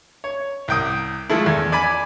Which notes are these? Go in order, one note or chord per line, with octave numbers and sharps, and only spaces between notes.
C#5
C2 G5 D#6
F3 G#3 A3 E4
E2
D5 G#5 B5